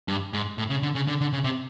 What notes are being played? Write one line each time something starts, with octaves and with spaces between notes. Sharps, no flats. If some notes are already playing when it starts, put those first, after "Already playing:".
G2
G#2
A2
C#3
D3
C#3
D3
D3
C#3
C3